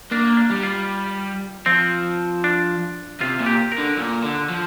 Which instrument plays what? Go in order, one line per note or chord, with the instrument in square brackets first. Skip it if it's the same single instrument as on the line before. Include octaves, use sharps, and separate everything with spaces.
[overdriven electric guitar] A#3 [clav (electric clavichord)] D4
[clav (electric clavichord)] D4
[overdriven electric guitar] G3
[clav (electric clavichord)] F4
[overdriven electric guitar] F3 [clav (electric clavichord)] C4
[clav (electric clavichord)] D4
[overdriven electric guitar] C3 [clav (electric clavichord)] F4
[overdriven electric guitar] A#2
[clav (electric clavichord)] G4
A#4
[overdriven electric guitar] D3
A#2
D3
F3